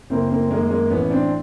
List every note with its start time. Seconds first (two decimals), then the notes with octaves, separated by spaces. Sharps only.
0.10 F#1 A#3 C4
0.30 A#3 C4
0.51 F#2 D#3 G#3 A#3
0.70 G#3 A#3
0.90 A1 B3 C#4
1.10 C4 D4